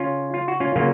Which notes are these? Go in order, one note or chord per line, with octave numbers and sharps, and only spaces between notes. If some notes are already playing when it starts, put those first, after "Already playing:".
Already playing: C#3 C#4 F4
F4
F#4
C#4 F4
C#3 F#3 A#3 C#4 F4